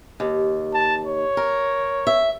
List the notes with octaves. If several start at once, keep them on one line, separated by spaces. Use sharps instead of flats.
D#2
A5
C#5
A#4
E5